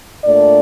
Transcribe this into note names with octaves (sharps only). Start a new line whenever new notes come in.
A#2 A3 D4 D5